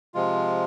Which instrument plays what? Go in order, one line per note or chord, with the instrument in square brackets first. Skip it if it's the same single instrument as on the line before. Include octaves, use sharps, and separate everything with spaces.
[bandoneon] C3 F3 G#3 F4